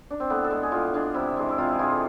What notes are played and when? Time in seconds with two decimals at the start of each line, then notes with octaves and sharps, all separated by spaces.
0.11 D4
0.20 C4
0.30 A2 B3
0.44 A4
0.51 G#3
0.63 G#4
0.72 A2 F4
0.94 G#3 D4
1.14 C3 E4
1.37 E3 G#3
1.49 E4
1.58 C3 F4
1.68 E4
1.73 G#4
1.79 E3 G#3 F4
1.90 A4